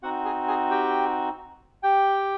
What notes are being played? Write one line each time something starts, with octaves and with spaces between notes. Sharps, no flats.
C4 D#4 F#4 F#5
G#4 G#5
G#4 G#5
G4 G5
G4 G5